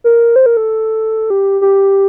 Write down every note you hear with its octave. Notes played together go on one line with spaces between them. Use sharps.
A#4
C5
A#4
A4
G4
G4